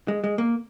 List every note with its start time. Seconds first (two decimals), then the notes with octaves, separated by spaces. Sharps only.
0.08 G#3
0.24 G#3
0.38 A#3